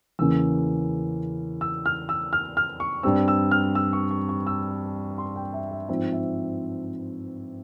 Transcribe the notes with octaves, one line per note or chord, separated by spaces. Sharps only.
E2 C#3 E3 A#3 C#4 E6
E6
F6
E6
F6
F6
C#6
G2 G3 C4 E6
E6
F6
E6
C#6
C#6
C#6
E6
C6
G5
E5
E5
G#2 F3 C4 E5
E5